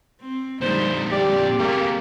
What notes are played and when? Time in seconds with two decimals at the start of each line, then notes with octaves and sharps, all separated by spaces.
0.21 C4
0.61 A#2 D3 G3 D#4 C5
1.12 C4 G4 D5
1.59 G3 A3 A#3 G4